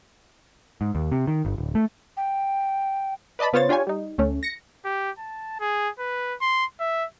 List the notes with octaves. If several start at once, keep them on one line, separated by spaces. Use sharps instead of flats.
G#2
D#2
C3
D#3
G1
D1
A3
G5
B4 D5 D#5 A5 B5
C#3 B3 F4 C5 C#5 A6
D4 F4 G4 C#5 G#5
G3 D#4
D2 A3 C#4
A#6 C#7
G4
A5
G#4
B4
C6
E5